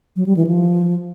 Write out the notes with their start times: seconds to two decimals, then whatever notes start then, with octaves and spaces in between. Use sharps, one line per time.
0.16 F#3
0.26 G3
0.37 E3
0.47 F3